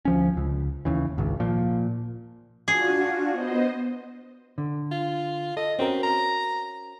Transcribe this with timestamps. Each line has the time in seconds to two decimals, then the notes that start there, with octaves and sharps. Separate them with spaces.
0.05 D2 F3 C#4
0.37 C#2
0.85 D#2 C#3 E3
1.18 G#1 C#2
1.40 A#2 F3
2.68 D4 F4 F#4 G#4
3.32 B3 C5 D#5
4.58 D3
4.91 F4
5.57 A4 D#5
5.79 C4 C#4 F#4 A#4
6.03 A#5